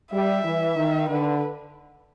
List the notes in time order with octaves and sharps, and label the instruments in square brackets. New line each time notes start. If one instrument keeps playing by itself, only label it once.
[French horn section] G3 [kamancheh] E5
[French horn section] E3
D#3
[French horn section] D3 [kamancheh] B4